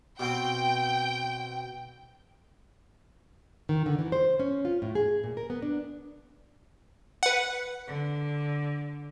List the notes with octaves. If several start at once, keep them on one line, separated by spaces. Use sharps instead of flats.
B2 C4 G5
D#3
D3
E3
C5
C#4
F4
A2
G#4
A#2
A#4
B3
D4
B4 F#5
D3